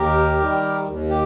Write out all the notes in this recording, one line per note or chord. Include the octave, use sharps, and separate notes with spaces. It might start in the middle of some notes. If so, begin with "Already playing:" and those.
Already playing: D#2 G4 A#4
D#3 G3
D#2
G4